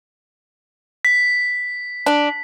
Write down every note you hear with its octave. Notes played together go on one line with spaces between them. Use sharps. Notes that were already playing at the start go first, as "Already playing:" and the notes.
B6
D4